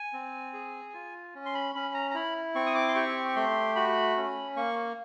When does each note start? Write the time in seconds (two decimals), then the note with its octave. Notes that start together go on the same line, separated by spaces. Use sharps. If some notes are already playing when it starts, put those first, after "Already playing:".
Already playing: G#5
0.13 C4
0.53 G#4
0.94 F4
1.35 C#4
1.46 C6
1.54 B5
1.75 C#4 B5
1.94 A#5
2.11 A#5
2.15 E4 B5
2.55 C4 C#6
2.66 D#6
2.75 D6
2.88 C6
2.95 G4 C#6
3.28 C#6
3.36 A3 C6
3.75 F#4 B5
4.17 C#4
4.56 A#3 C#6